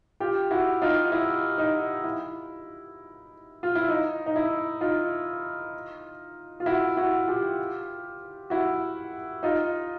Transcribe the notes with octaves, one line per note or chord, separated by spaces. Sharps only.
F4 G4
E4 F#4
D#4 F4
E4
D#4
E4
F4
E4
D#4
D#4
E4
D#4 F4
F4
E4 F#4
E4 F#4
F4 G4
E4 F#4
D#4 F4